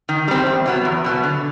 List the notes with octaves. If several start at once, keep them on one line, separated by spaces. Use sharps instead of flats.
D#3
G3 C4
E2
B2 F#3 B3
E2
B2 F#3 B3
D3